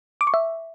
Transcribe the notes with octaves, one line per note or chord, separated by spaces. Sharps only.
D6
C#6
E5